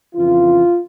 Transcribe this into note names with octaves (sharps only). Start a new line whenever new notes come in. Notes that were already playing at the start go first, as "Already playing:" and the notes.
F2 C#3 E3 F4